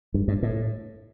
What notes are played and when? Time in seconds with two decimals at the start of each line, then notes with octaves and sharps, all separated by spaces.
0.14 G2
0.28 G2
0.43 A2